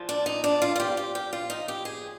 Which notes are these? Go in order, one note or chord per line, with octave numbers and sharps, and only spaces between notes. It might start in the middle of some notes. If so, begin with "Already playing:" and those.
Already playing: A#2 F3
D4
D#4
D4
F4
F4
G4
G4
G4
F4
D#4
G4
G#4